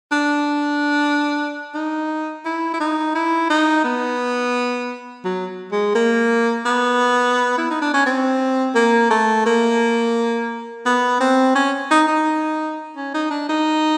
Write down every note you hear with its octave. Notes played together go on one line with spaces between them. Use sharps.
D4
D#4
E4
E4
D#4
E4
D#4
B3
F#3
G#3
A#3
B3
E4
D#4
D4
C#4
C4
A#3
A3
A#3
B3
C4
C#4
D#4
D#4
C#4
D#4
D4
D#4